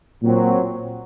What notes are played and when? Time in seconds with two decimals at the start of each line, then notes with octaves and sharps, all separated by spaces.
0.23 A#2 F#3 C4